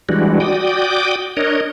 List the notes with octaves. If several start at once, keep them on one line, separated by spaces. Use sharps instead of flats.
E3 G3 G#3 D4 F#4
F#4 D5 G5 D6 D#6
D4 A#4 C#5 D#5